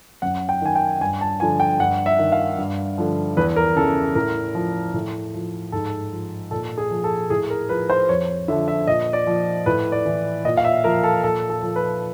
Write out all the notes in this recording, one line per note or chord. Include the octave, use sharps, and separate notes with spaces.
F#2 F#5
G5
D#3 G#5
G5
G2 G#5
A5
D3 F3 G#5
G5
G2 F#5
E5
D#3
F5
G2
D3 F3
E2 B4
A#4
C#3 E3 A4
A2 A#4
F3
A2
F3
G#2 A4
F3
A#2 A4
G#4
F3
A4
A2 G#4
A#4
F3 B4
C5
F2 C#5
D3 F3 E5
E5
A#2 D#5
D5
F3
A2 B4
D5
E3
A#2 D#5
F5
E5
F3 A#4
A4
A#2 A4
A4
F3
B4